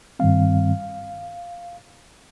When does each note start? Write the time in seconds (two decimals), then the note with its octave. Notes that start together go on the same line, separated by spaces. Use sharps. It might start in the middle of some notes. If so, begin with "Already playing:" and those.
0.19 G2 D#3 G3 C4 F5